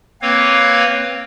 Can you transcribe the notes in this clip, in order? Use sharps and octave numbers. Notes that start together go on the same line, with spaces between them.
A#3 C4 B4 C#5 F5